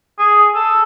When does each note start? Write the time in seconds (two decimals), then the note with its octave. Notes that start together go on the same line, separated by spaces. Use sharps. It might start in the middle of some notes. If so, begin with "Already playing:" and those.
0.18 G#4
0.55 A4